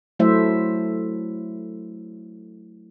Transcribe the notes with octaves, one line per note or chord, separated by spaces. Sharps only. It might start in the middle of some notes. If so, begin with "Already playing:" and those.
F#3 A3 E4 C5 E5